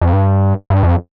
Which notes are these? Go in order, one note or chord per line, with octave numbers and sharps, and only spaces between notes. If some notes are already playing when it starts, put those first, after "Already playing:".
F2
G2
G2
F2